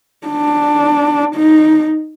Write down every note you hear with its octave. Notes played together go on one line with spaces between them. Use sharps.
D4
D#4